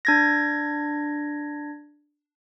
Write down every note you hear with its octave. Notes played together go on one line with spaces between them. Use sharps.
D4 G#6 A#6